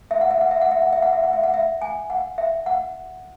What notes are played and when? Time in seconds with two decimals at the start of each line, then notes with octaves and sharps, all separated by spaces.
0.11 E5
0.21 F#5
0.31 E5
0.41 F#5
0.51 E5
0.61 F#5
0.71 E5
0.82 F#5
0.93 E5
1.02 F#5
1.13 E5
1.23 F#5
1.33 E5
1.44 F#5
1.54 E5
1.82 G#5
2.10 F#5
2.38 E5
2.66 F#5